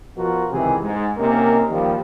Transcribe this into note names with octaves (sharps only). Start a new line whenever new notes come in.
B2 F3 F4 F#4 A#4
C#2 C3 D#3 E3 G#4
G#2
C3 A#3 C#4 D#4 A#4
D#2 D#3 F3 G3